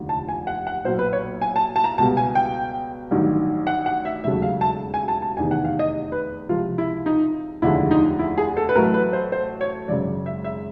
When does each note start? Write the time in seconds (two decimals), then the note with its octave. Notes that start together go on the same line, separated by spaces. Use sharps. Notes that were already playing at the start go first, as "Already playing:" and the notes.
Already playing: F1 D#2 D3 F3
0.09 A5
0.29 G#5
0.47 F#5
0.67 F#5
0.85 B1 A#2 F#3 C5
0.99 B4
1.13 C#5
1.42 G#5
1.56 A5
1.76 A5
1.84 A#5
1.98 C#2 B2 G3 A5
2.17 G#5
2.35 G5
3.11 A1 G2 D#3 F#3
3.67 F#5
3.86 F#5
4.05 E5
4.24 E1 D#2 C#3 F#3 A3 E5
4.42 F5
4.61 A5
4.94 G#5
5.08 A5
5.22 A5
5.37 F1 E2 C3 D#3 G#5
5.51 F#5
5.65 F5
5.79 D#5
6.12 B4
6.49 C#2 C3 F3 F4
6.78 E4
7.06 D#4
7.62 F1 D#2 D3 F3 G#3 E4
7.91 D#4
8.19 E4
8.38 G#4
8.57 A4
8.69 B4
8.76 A1 A2 F#3 A3 A#4
8.94 B4
9.13 C5
9.32 C5
9.61 C#5
9.88 G#1 F#2 C#3 D5
10.26 E5
10.44 E5